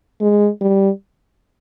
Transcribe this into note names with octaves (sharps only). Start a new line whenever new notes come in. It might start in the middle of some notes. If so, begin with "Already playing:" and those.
G#3
G3